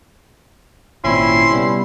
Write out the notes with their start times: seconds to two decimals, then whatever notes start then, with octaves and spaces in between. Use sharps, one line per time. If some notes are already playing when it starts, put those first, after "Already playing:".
1.04 G#1 A#2 C4 C#4 E4 C6
1.51 C3 G3 B3